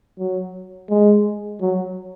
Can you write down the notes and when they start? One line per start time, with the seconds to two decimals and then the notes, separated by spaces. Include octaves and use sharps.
0.19 F#3
0.90 G#3
1.61 F#3